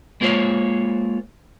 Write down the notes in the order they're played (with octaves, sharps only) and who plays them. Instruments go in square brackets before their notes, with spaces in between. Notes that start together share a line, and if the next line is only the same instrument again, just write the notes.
[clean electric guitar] G#3 A#3 F4 C5 C#5